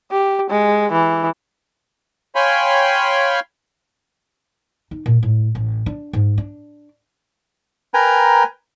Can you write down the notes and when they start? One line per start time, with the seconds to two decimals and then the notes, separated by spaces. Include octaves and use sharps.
0.11 G4
0.50 G#3
0.92 E3
2.35 C#5 F5 G5 G#5 B5 C6
4.91 D#4
5.06 A#2
5.23 A2
5.55 A1
5.86 D4
6.13 G#2
6.38 D4
7.94 A#4 B4 G5 G#5 A#5